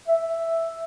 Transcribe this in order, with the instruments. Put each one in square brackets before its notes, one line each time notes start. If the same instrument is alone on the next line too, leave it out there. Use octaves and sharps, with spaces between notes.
[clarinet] E5